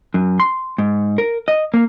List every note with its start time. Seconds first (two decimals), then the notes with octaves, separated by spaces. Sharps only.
0.14 F#2
0.40 C6
0.78 G#2
1.18 A#4
1.48 D#5
1.74 A#3